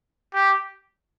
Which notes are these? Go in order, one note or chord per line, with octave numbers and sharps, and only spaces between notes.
G4